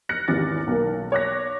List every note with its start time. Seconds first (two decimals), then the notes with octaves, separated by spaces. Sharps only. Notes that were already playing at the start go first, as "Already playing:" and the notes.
0.09 F6 F#6 A#6 C#7
0.28 G#1 E2 C#4 G4 D6 A6
0.67 B1 A#3
1.12 C#5 D6 F#6 A#6